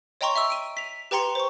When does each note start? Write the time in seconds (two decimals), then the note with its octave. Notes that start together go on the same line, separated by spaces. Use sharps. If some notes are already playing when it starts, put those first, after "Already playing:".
0.21 C#5 D#5 G5 A#5 C6 C#6
0.36 E5 C#6 E6
0.50 D7 D#7
0.77 B6 F7
1.11 G4 B4 G5 A#5 C6 C#7
1.35 C5 C#6